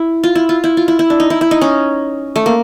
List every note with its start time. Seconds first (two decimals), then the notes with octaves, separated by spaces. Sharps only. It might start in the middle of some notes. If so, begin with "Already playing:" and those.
Already playing: E4
0.23 F4
0.35 E4
0.49 F4
0.64 E4
0.77 F4
0.88 E4
0.99 E4
1.10 D4
1.20 D#4
1.30 E4
1.41 E4
1.51 D#4
1.61 C#4
2.36 A3
2.46 A#3